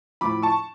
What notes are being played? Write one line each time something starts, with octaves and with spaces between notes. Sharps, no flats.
A2 F3 B5 D6
A5 C#6